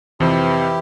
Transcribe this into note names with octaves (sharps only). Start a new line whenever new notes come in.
F2 C3 E3 E4 G4 C5